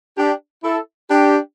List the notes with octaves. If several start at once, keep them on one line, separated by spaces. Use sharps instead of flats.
D4 G4
E4 A4
D4 G4